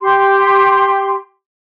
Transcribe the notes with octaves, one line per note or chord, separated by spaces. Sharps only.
G4 C6